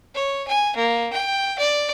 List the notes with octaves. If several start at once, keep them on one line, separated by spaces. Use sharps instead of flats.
C#5
G#5
A#3
G5
D5